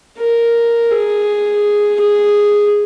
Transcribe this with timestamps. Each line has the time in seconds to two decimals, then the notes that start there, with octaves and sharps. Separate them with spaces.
0.19 A#4
0.91 G#4
2.00 G#4